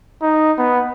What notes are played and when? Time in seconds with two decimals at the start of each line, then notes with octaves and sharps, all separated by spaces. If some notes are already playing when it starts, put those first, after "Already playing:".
0.22 D#4
0.59 B3